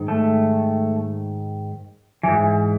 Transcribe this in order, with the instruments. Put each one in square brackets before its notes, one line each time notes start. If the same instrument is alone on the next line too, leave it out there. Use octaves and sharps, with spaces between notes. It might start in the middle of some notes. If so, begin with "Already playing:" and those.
Already playing: [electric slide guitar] G#2 D#3
A3
G#2 E3